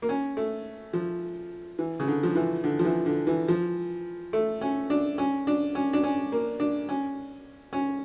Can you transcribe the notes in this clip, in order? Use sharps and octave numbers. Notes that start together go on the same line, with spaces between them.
A#3
C#4
A3
F3
E3
C#3
D3
F3
E3
D3
F3
E3
D3
E3
F3
A3
C#4
D4
C#4
D4
C#4
D4
C#4
A#3
D4
C#4
C#4